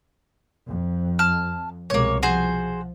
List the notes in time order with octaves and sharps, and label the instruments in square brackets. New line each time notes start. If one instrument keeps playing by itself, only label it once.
[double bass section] F2
[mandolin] A5 F6
[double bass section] C2 B2 G#3 [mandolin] A#3 C#5
[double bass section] F3 [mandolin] F#4 G#4 C5